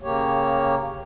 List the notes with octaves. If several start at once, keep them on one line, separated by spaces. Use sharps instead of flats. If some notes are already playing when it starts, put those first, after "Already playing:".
C#3 A#3 G4 C#5